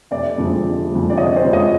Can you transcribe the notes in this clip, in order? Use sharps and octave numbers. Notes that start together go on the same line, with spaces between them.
F1 D5 E5
F2 D3 F3 G#3
F1
F2 D3 F3 G#3
D5
F1 C#5 D#5
C5 D5
F2 D3 F3 G#3
C#5 D#5